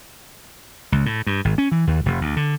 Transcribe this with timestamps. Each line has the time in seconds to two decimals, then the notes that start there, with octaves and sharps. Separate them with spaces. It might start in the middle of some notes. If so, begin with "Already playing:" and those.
0.92 C#2
1.06 A2
1.26 G2
1.45 G#1
1.58 C#4
1.72 E3
1.87 D#2
2.06 F1
2.21 D2
2.36 D3